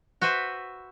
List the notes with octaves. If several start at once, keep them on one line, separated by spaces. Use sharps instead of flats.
F#4 B4 C5 E5